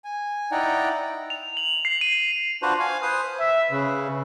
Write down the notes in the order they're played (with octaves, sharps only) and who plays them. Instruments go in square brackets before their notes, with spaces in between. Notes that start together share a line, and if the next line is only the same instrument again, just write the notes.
[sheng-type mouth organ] G#5
D#4 E4 D5 F#5 G5 A#5
[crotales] F7
F#7
C7
D#7
[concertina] D4 F4 F#4 B4 C5
F5 G#5
B4 C5 D#6
[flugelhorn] E5
[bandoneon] C#3 [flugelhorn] B4